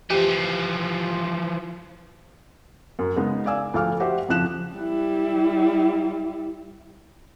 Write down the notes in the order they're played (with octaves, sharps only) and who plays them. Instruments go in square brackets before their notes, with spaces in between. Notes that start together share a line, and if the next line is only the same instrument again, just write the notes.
[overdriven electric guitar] E3 F3 [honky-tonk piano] G4
[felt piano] F#2
C#3 G#3 B3 D#4
D5 F5 G#5 E6
D2 F3 A4 F5 D6 F6
F#4 G4 C5 E5 F#5
F2 C#3 F3 F#6 E7
[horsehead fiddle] G3 E4